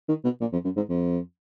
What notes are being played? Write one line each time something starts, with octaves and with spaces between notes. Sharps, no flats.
D#3
B2
A#2
F2
F#2
G#2
F2